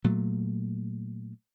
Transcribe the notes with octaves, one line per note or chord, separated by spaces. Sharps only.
A#2 F#3 A3